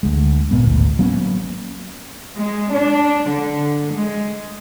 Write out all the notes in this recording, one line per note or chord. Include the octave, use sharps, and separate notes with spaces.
D2 G#3
G#1 A#2 G#3 B3
G#1 D2 A2
F#3 A#3 B3 C#4
G#3
D4
D3
G#3